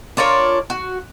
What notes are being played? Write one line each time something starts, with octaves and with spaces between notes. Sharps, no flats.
D4 F4 A#4 C#5
F#4